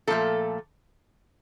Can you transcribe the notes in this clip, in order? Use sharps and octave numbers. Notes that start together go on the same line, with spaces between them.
A#2 F3 A3 A4